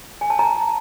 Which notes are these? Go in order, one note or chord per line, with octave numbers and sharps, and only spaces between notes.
G#5
A5
A#5